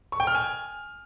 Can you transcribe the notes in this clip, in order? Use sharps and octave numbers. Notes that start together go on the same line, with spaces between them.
C#6
G5
F6
G#5